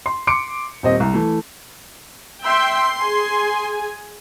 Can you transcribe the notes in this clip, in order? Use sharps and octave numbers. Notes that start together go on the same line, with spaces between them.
C6
C6 D6 C#7 D7
D#1 C4 D#5
C2
E3 A3
E5 G5 C6
G#4 G#5